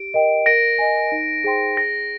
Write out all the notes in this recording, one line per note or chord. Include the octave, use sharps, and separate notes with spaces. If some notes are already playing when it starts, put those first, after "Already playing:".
Already playing: G4 D7
A#4 D#5 G5
A#4 A#6 D7
D#5 G#5
D#4
G#4 C5 G5 C6
G#4 A#6